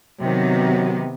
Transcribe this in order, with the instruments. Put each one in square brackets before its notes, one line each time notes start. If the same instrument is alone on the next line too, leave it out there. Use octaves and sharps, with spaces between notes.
[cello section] C3 D#3 B3 [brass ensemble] F#3